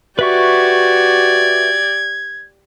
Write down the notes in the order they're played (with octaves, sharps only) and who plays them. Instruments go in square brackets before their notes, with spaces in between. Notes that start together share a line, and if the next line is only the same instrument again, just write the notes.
[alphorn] F#4 [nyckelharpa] G4 D5 [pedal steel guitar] B4 E5 C#6 [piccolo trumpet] G#6